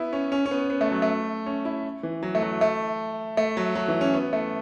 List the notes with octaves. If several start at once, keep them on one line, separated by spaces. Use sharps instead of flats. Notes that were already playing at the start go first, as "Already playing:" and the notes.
Already playing: B3 E4
C#4
C#4
C#4
B3
B3
A3
F#3
A3
C#4
E4
E3
F#3
A3
F#3
A3
A3
F#3
F#3
E3
C#4
B3
A3